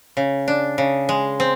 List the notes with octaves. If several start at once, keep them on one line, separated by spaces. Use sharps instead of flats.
C#3
D4
C#3
G#3
C4